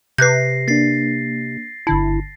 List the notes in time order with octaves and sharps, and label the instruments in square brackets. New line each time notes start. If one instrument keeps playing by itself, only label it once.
[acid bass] C3 [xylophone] B4 F#6 G6 [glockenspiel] A#6 C7
[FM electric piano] A#3 D4 [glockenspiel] A6 C7
[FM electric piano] G1 D3 A5 [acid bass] E4